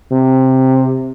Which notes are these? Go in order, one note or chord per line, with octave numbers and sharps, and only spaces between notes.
C3